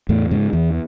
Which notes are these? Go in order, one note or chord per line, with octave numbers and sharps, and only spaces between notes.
E2 A2 A3
G#2 C#3 G#3
E2 E3